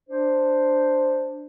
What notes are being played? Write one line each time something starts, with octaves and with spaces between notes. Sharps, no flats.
D4 C5